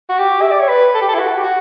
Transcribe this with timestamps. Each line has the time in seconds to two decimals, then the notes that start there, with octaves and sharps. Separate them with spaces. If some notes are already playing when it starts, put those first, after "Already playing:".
0.09 F#4
0.19 G4
0.42 E5
0.51 D5
0.60 C#5
0.68 B4
0.94 A4
1.02 G4
1.08 A4
1.14 E4
1.19 F#4
1.37 G4
1.44 F#4